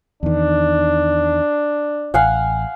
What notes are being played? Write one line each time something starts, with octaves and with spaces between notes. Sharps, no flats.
E2 D#3 D4
A1 F5 F#5 G#5